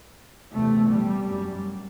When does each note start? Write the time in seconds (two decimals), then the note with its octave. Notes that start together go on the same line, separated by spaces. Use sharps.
0.53 E2 C3 A3
0.90 G3
1.27 F#2